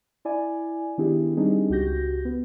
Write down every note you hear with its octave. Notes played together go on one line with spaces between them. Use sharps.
E4 D5 G#5
D#3 B3 D4 E4 G4 G#4
G3 C4 D4 D#4 G#4
C#2 F#4 G4 G6 A#6
B3